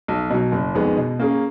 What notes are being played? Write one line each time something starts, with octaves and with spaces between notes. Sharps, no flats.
B1
B2 F#3
F#1
F2 D#3 G#3 B3
B2
A#3 C#4 G#4